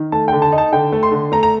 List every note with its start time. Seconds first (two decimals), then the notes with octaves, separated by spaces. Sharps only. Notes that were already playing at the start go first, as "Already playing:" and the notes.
Already playing: D#3
0.12 A3 A5
0.28 D3 G5
0.42 A5
0.52 D#4
0.58 A5
0.72 D3 G5
0.92 A3
1.03 C6
1.12 D3
1.32 A3 A#5
1.43 A#5